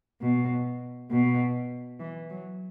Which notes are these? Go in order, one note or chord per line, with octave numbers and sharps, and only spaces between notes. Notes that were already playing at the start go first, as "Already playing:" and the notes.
B2
B2
E3
F#3